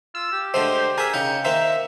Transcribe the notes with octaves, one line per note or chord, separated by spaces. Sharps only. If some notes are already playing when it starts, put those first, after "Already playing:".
F4 E6
G4
D3 G#3 A3 C5
G#4 A#4 E5
C#3 D#4 G5 C#7
D#3 A#3 C5 E5